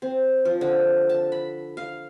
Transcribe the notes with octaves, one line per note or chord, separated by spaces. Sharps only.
C4
F3
D3
A5
B5
F5